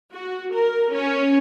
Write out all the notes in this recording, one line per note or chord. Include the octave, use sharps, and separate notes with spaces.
F#4
A#4
C#4